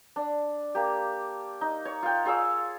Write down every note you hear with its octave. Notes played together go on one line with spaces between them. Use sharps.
D4
A#3 G4
D#4
C#5
F4 G5
F4 G#4 C#5 E6